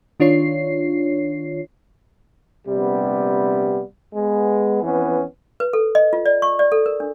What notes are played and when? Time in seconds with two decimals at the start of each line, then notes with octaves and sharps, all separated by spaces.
0.20 D#3 D4 F4 C#5 C7
2.67 A#1 C3 G3 B3
4.14 G#3 B3
4.82 F2 E3 B3 C#4
5.60 B4
5.73 A4
5.95 D#5
6.13 F4
6.26 D5
6.42 C#6
6.59 D5
6.72 A4
6.86 A#4
7.00 D4